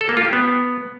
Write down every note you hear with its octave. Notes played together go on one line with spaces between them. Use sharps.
A4
A#3
F4
G4
B3